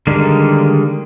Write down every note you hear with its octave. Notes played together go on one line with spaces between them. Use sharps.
D3 D#3 G3 G#3 A#3